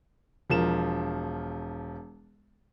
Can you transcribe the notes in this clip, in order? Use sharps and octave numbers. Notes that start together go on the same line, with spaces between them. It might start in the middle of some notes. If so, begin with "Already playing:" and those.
E1 F3 A#4 E7